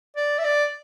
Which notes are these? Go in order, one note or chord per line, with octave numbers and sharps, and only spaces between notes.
D5
E5
D5